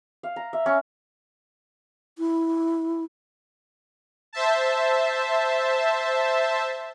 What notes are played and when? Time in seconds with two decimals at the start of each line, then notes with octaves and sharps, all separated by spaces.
0.23 F5
0.36 A#5
0.53 E5
0.66 C#4
2.18 E4
4.33 C5 E5 A5